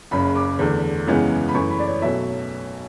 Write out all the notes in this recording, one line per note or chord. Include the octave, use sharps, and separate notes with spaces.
F#1 F#2 C#3 B5
D6
E2 D3 A3
F#2 C#3 E3 G#3 B3
B5
F#2 E3 A3 C#6
B5
D5
C#5
B1 B2 F#3 A3 E5